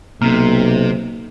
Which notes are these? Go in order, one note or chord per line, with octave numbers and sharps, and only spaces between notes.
B1 C3 A#3